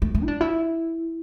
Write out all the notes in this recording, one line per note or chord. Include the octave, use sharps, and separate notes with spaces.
A3
A3
E4
D4
E4